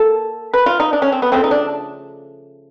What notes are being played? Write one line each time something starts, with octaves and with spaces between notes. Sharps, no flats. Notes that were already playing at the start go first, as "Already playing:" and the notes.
Already playing: A#3 A4
B4
F4
D#4
D4
C#4
C4
B3
C#3 F3 A3 C4
D#4
D4